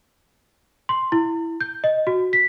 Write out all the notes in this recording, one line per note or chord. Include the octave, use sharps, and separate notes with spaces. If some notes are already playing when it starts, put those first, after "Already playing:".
C6
E4
G6
D#5
F#4
B6